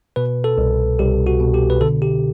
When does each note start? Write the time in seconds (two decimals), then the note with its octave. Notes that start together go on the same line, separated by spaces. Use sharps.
0.16 B2 B4
0.44 A4
0.58 C2
0.99 C2 G4
1.27 F#4
1.40 B2
1.54 G4
1.70 B4
1.81 D3 A4
2.02 G4